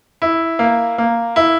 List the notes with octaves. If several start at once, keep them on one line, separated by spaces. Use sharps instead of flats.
E4
A#3
A#3
E4